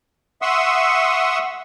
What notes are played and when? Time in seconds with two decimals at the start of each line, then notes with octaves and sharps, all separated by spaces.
0.42 E5 F#5 C6 C#6 D#6 E6